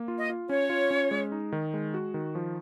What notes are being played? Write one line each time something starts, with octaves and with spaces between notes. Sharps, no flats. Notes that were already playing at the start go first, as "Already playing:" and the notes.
Already playing: A#3
F4
D#5
F4
C#4 C#5
F4
C#4
G#3
D#4
D#3
G#3
F#4
D#3
F3